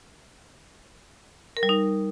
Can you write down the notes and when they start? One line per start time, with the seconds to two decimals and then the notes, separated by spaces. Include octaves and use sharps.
1.57 A#4
1.63 G3
1.69 D#4